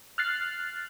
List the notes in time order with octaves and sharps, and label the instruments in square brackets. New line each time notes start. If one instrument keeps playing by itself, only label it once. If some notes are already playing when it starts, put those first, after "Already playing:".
[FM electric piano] F6 F#6 A6 C7